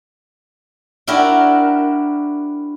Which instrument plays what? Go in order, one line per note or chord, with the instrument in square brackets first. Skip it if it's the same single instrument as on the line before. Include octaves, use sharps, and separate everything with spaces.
[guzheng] D4 E4 F#4 G4 A#4